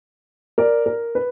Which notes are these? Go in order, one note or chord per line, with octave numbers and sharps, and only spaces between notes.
A#4 D5
A#4
B4